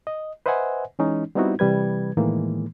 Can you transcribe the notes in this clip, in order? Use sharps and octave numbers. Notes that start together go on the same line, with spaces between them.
D#5
B4 C5 D#5 E5 F#5 G#5
E3 G#3 C#4 D#4
G3 B3 C4 D#4 E4 F#4
C3 E3 G3 B4 G#6
A2 D#3 E3 G#3 A#3